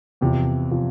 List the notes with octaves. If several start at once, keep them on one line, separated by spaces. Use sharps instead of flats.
E2 C3 F3
C3 F3